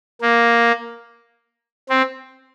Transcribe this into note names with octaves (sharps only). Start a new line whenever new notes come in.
A#3
C4